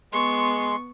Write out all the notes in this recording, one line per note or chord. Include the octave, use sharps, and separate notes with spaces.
G#3 B3 C6 C#6